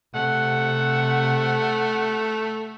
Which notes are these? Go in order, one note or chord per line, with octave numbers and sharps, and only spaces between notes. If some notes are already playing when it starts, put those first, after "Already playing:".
C3 A3 F#5